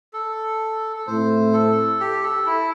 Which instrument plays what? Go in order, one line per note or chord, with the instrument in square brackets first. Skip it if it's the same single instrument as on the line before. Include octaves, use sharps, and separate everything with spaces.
[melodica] A4
A4
[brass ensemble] A2 A3 C4 E4 [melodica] C5
[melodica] A4
G4
A4
E4